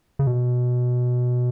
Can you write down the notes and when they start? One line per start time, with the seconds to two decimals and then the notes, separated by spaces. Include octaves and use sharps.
0.19 C#3
0.27 B2